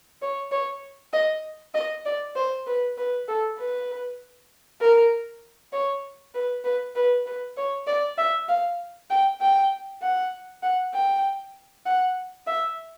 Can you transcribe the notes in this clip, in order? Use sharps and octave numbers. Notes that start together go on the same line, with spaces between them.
C#5
C#5
D#5
D#5
D5
C5
B4
B4
A4
B4
A#4
C#5
B4
B4
B4
B4
C#5
D5
E5
F5
G5
G5
F#5
F#5
G5
F#5
E5